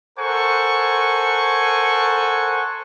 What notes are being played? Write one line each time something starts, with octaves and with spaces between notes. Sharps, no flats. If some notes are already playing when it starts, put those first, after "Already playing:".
A4 A#4 C5 F#5 G#5 C#6